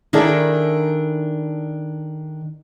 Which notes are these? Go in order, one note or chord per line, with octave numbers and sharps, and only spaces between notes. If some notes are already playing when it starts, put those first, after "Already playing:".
D#3 D4 E4 G#4 A4